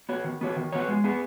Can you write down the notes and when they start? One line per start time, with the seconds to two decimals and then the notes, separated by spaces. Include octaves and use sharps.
0.09 B3 F#4 C#5
0.24 D#3
0.41 B3 F#4 C#5
0.56 D#3
0.72 B3 F#4 C#5
0.88 G#3
1.04 B3 G#4